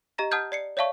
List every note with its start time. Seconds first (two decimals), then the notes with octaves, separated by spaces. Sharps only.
0.18 G4 D#5 A#5 A#6
0.31 F#5 A5 D#6 F6 G6 G#6
0.52 D5 C7 C#7
0.77 C#5 D5 E5 F5 A5 C#6